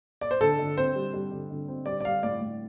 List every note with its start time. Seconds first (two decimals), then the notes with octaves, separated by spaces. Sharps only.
0.21 D5
0.31 C5
0.41 D3 A4
0.59 D3
0.77 C4 C5
0.96 G3
1.14 G3
1.31 D3
1.50 D3
1.68 C4
1.86 G3 D5
2.01 D5
2.05 G3 F5
2.23 A2 D5
2.41 A2